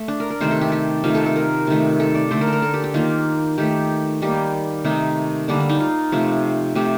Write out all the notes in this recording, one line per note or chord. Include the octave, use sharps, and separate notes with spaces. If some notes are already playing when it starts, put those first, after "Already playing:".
Already playing: A3
D4
A#4
A#4
C3 D#3 A3 C5
A4
G4
G4
C3 D#3 A3 F4
A4
A4
A#4
C3 D#3 A3
A4
D5
D3 A3 C5
A#4
A4
A#4
A4
G4
G4
D#3 A#3 F4
D#3 A3 G4
D#3 G3 A#3 G4
C3 D#3 A3 D#4
D3 G3 A#3 D4
D4
D#4
F4
C3 F3 A3
C3 F3 A3 G4